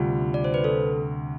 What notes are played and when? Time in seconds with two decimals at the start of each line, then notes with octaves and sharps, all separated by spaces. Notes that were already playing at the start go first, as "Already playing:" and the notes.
Already playing: D2 C3 G3 F4
0.34 D5
0.44 C5
0.54 B4
0.64 A4